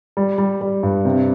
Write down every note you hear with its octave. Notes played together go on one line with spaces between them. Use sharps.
G3
G3
G3
G2
C3